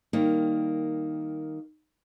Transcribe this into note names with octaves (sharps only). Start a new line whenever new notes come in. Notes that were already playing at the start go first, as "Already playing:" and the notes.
D#3 G3 A#3